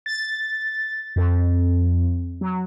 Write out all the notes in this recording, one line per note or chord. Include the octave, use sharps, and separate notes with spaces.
A6
F2
F#3